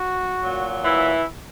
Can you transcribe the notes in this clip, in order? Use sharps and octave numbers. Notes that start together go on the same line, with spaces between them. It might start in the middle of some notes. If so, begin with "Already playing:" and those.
Already playing: F#4
A#2 F#3
E3 E4